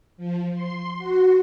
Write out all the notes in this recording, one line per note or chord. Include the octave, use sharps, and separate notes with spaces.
F3
C6
F#4